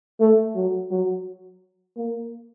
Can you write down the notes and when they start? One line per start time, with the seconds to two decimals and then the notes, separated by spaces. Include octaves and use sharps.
0.20 A3
0.55 F#3
0.91 F#3
1.97 A#3